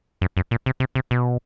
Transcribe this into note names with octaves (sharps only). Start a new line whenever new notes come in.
F#2
F#2
A#2
C3
C3
C3
B2